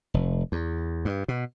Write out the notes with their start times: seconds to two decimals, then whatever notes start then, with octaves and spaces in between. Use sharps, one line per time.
0.14 F1
0.52 E2
1.05 G2
1.28 B2